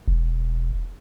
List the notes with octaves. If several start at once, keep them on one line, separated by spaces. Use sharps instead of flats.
E1